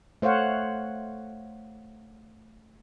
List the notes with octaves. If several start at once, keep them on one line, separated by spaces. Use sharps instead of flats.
A3 C5 C#5 F5 F#5